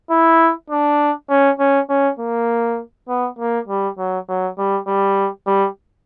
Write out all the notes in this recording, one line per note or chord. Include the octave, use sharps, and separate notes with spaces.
E4
D4
C#4
C#4
C#4
A#3
B3
A#3
G3
F#3
F#3
G3
G3
G3